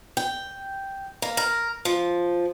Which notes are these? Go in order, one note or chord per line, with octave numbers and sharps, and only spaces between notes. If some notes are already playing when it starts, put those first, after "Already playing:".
G5
A#3
A#4
F3